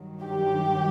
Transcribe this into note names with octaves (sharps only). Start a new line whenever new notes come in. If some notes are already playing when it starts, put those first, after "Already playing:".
Already playing: G2 D#3 F#3
G4